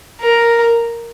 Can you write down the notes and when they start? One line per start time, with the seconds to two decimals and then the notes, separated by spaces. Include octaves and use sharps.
0.21 A#4